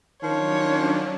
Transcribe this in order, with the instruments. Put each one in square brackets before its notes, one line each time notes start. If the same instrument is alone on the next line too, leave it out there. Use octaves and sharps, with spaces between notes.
[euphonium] D#3 [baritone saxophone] F3 [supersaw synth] F#3 C#4 D4 [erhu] C#5